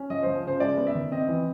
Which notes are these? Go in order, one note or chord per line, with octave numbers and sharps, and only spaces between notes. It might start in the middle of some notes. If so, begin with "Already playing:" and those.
Already playing: C#4
F3 D#5
F3 C5
C#3 C5
G#3 D5
B3
E5
D#3
C4 D#5
E3